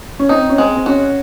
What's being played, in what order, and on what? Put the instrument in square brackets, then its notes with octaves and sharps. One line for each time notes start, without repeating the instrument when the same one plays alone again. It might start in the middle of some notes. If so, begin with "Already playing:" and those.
[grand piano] C#4
[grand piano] C4 [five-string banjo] D#4
[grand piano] C#4
[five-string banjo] G#3 [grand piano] C4
[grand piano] C4
[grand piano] C#4 [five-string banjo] F#4